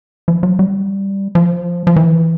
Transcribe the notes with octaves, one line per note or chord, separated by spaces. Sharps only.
F3
F#3
G3
F3
F3
E3